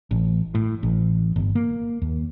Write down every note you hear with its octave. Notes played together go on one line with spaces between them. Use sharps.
A1
A2
A1
G1
A#3
D#2